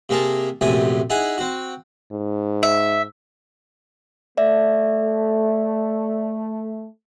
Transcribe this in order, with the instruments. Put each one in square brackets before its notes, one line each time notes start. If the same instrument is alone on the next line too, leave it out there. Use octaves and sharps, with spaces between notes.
[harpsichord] C3 A#3 G#4 A#4 A5
A#1 F#2 C3 A3 G#5 D#6
D#4 E4 G#4 F#5 G#5
C4 F#4
[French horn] G#2
[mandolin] E5
[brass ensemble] A3 [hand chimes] D5 E5